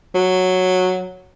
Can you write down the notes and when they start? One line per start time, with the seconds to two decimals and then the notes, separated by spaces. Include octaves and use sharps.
0.15 F#3